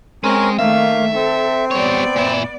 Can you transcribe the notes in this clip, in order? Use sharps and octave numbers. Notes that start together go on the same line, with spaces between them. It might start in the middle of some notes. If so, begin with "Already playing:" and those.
G#3 C4 C#4 A#4
D#3 A3 A#3 E5 F5
C4 A4
G3 B3 C#5 D5
A#2 E4